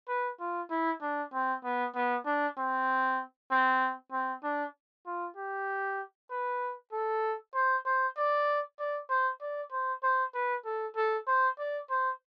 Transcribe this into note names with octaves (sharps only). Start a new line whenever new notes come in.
B4
F4
E4
D4
C4
B3
B3
D4
C4
C4
C4
D4
F4
G4
B4
A4
C5
C5
D5
D5
C5
D5
C5
C5
B4
A4
A4
C5
D5
C5